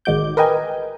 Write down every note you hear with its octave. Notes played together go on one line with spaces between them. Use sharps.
A1 D#3 G#3 F#4 D6 G6
A#4 B4 D#5 G5 G#5